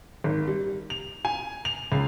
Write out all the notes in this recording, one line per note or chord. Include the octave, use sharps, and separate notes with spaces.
G#1
G3
F7
G#5
F7
C#2